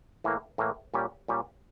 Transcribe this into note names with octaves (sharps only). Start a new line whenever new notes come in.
A2 E3 A#3
A2 E3 A#3
A#2 G3 C#4 G4
A#2 G3 C#4 G4